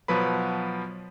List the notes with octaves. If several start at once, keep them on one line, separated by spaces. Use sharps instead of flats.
B2 F3 F#3 B4 B5